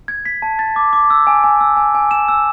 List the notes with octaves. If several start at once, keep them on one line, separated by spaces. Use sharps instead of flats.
G#6
B6
A5
A6
D6
D6
E6
G#5
G#5
E6
G#5
G#5
E7
E6